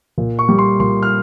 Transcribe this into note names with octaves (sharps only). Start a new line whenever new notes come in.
A#2
C#6
G3
C6
A#2 C6
F6